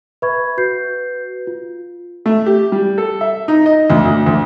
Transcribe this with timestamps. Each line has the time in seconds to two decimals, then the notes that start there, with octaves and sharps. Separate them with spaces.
0.22 B4 E5 B5 C#6 G#6
0.57 F#4 B4 G6 C7
1.47 F4
2.26 A3
2.46 G4
2.72 G3
2.98 A4
3.21 E5
3.48 D#4
3.66 D#5
3.90 D2
4.05 D2
4.26 D2